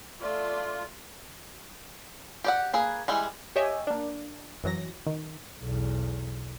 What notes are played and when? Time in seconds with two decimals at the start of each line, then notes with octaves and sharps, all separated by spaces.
0.20 A3 F4 D5
2.44 G4 D5 F#5
2.73 A#3 G#4 B4
3.08 E3 G3 G#3
3.56 G4 C#5 D#5 E5 G5 G#5
3.87 A#3 D4
4.64 F#2 E3 F#3 A#6
5.06 D#3
5.59 B1 E2